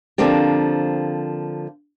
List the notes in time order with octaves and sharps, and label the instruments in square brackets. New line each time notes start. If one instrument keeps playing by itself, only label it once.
[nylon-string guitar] D3 F3 A#3 C4 G4